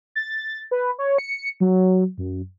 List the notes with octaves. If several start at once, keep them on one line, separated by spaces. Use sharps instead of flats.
A6
B4
C#5
C#7
F#3
F#2